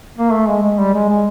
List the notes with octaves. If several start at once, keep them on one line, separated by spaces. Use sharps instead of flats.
A#3
A3
G#3
G#3
G3
G#3
G#3